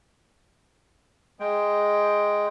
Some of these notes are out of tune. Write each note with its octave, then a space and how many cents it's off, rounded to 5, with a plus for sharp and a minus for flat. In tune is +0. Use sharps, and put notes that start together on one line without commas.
G#3 +0 G5 +0